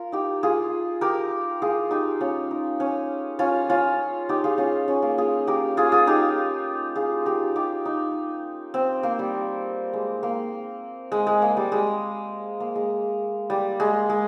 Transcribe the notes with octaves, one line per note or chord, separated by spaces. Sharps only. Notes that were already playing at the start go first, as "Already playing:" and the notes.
Already playing: F4 A#4
D#4 G4
F4 G#4
G4 A#4
F4 G#4
D#4 G4
C#4 F4
D#4
C#4
C#4 F4
C#4 F4
D#4 G4
F4 G#4
C#4 F4
C#4
A#3
F4 G#4
G4 A#4
F4 G#4
F4 G#4
D#4 G4
F4 G#4
G4 A#4
D#4 G4
D#4
C4
A#3
G3
G#3
A#3
G#3
G#3
A#3
G3
G#3
A#3
G#3
G3
G#3
G#3